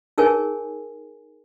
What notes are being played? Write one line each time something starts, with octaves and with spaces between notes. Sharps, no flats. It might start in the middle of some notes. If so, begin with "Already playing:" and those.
D#4 G#4 A#4 C#5 G#5